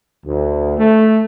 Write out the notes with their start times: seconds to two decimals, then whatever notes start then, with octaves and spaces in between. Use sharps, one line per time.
0.25 D2
0.78 A3